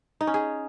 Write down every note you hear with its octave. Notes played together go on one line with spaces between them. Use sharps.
D#4
C#4
G#4